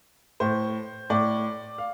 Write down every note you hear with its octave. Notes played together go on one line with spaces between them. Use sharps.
A2 C5
A2 D5
F5